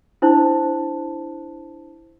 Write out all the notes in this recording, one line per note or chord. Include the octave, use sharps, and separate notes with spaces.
D4 E4 C5 A5